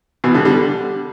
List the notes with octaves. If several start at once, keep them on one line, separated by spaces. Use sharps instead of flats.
B2 E3
D3 G3
D3 G3